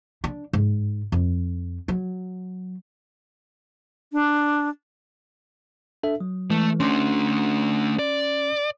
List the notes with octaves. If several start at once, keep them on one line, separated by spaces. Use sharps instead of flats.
D4
G#2
F2
F#3
D4
D4 A4 E5
F#3
E3 G#3 A3
A3 C#4 D4 C6
D5